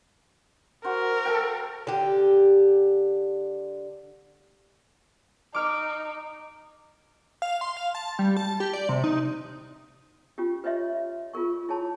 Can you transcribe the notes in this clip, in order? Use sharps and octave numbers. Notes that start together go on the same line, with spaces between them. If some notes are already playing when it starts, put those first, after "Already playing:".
F#4 A#4 C5
A4 F5 G5
D3 G4
D#4 D6 F6 D7
F5
C6
F5
A5
G3
A5
G4
D5
C3
D#4
C#4 F4 G4
B4 C#5 D#5 E5 C6
F4 G#4 A#4 C#6
E4 G#4 C#5 A5 B5